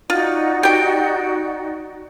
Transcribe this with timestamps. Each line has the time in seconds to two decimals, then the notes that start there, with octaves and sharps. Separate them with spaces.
0.10 D#4 F4 F#4 D5
0.63 G4 G5